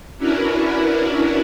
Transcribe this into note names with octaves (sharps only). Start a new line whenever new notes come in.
C#4 D4 E4 F#4 A#4 B4